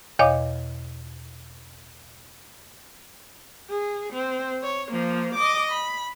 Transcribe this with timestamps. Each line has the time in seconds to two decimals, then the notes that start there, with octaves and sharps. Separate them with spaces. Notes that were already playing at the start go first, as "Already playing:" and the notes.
0.19 E2 B2 C#5 D#5 F5 D6
3.69 G#4
4.13 C4
4.63 C#5
4.91 F3 A#3
5.35 D#5 D6
5.71 B5